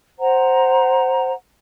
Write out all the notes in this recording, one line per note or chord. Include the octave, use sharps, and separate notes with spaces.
C5 F#5 A#5